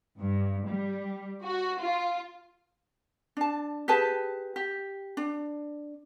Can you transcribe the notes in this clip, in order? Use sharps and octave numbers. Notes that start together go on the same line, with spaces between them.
G2
G3
F#4
F4
D4 A5
G4 G#4 B4 A5
G4
D4